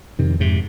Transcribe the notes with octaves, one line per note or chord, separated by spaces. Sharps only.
F2 C3 D#3
F2 G#2 C3